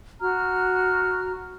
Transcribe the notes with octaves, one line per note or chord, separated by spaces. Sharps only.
F#4 A#5 F6